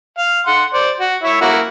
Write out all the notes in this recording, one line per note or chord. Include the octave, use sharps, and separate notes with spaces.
F5
F#5 C6
C5 D5
F#4
E4 C#5 E5
A#3 E4 F#4